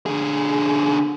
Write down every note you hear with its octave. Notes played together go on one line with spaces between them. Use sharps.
D3 G#4